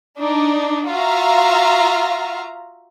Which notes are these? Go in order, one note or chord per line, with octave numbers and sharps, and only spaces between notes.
D4 D#4
F4 F#4 E5 F5 A#5